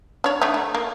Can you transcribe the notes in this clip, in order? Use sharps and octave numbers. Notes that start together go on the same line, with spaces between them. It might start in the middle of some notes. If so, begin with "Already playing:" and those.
D4 C#5
D3 A3 D#4
A3
A#3